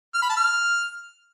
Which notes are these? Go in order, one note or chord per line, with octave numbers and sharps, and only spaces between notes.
F6
B5
A5
F6